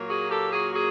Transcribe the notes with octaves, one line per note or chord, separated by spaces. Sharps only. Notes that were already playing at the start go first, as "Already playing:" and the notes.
Already playing: A#2 F#3 A#3
F#4 G#4
G4 A4
F#4 G#4
F#4 G#4